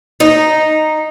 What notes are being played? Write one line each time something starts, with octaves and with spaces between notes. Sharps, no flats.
D#4